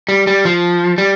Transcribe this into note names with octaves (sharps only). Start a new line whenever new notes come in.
G3
G3
F3
G3